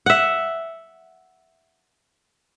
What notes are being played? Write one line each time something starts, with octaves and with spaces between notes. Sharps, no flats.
E5 F#5